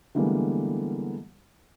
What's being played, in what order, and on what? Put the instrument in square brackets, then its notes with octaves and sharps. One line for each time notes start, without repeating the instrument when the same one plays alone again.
[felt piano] D3 E3 G3 G#3 A#3 B3